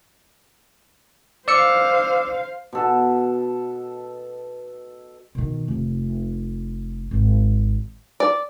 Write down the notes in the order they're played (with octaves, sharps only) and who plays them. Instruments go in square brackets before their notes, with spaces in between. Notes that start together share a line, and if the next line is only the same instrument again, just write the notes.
[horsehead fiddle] C5 F5 [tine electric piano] D5 E6 C#7
[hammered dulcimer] B2 A4
[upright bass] B2 D#3
F1
G#1
[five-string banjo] D5